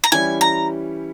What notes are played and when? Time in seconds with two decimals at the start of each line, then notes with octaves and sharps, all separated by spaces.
0.04 A#5
0.12 E3 G3 C#4 E4 G4 G#5
0.41 A#5